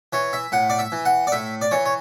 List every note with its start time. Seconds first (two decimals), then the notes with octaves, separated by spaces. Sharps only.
0.13 E3 C#5
0.33 E5
0.52 A2 F#5
0.70 D5
0.79 E5
0.92 E3
1.05 F#5
1.27 D5
1.32 A2 E5
1.61 D5
1.71 E3 C#5
1.85 C#5